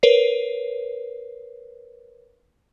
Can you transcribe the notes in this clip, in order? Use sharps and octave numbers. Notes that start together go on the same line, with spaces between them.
A#4 B4 C#5 C7